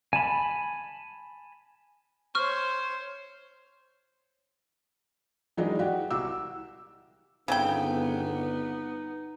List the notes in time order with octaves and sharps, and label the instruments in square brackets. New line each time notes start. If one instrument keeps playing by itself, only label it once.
[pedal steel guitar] G#5 A5 B5
[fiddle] C5 C#5 [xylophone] C#6 F6
[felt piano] D#3 E3 F#3 G#3 D4 D#4
F#4 G4
C2 F#4 D6 E6
[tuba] G1 [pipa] C#3 C4 G5 [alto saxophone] B3 [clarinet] D#4